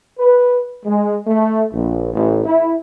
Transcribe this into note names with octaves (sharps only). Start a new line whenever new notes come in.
B4
G#3
A3
A#1
A1
E4